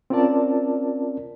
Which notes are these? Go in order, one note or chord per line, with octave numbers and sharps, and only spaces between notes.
C4 C#4 F4 A#4 D5 A5